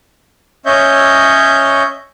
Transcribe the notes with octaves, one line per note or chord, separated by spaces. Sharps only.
C#4 C#5 D#5 E5 G6